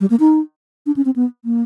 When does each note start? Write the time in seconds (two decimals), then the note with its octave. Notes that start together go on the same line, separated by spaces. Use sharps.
0.01 G3
0.10 A#3
0.20 D#4
0.86 D4
0.96 C#4
1.06 C4
1.16 B3
1.45 A#3